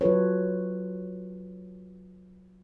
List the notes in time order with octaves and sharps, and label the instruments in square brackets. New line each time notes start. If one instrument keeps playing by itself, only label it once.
[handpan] F#3 F4 A4 B4 C#5